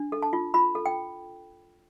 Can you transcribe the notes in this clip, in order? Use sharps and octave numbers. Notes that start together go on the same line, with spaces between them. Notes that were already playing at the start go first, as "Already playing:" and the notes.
Already playing: D4
A4
A5
F4
F4 B5
A4
G5